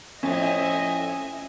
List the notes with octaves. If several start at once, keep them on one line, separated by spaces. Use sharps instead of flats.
F2 A2 C#4 D#5 E5 G#5